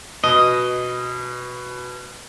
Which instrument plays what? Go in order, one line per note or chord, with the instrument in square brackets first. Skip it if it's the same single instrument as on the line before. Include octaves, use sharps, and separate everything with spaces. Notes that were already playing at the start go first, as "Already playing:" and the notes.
[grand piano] B2 [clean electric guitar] D#5